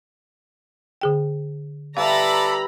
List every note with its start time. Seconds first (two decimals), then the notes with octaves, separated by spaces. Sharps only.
1.01 D3 G#4 G5
1.97 G3 E4 A4 B4 D5 F5 A#5 B5